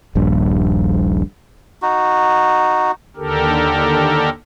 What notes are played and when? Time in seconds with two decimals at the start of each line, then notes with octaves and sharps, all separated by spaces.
0.15 D#1 A#1 G2
1.82 D#4 F#4
3.17 D#2 D3 G4 A4 A#4